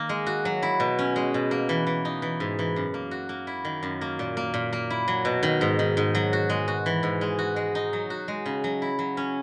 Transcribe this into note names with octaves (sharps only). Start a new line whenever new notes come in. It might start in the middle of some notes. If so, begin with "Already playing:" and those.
Already playing: D#3 A#3
G#3
F#4
F#3
E4
B2
C#4
G#3
B2
A#3
E3
E3
D#4
E3
G#2
E3
F#2
A#3
F#4
A#3
E4
D#3
F#2
A#3
A#2
A#3
A#2
A#3
E4
F#3
B2
D#3
G#2
D#3
G#2
F#3
F#4
G#3
F#4
E3
G#2
G#3
F#4
G#3
D#4
F#3
F#4
G#3
C#3
F#3
E4
F#3
C#4